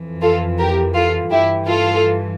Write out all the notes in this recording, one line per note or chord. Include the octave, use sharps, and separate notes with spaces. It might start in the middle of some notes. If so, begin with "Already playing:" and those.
Already playing: F2 E3
F4 A4
G4 A#4
F4 A4
G2 E3 E4 G4
F4 A4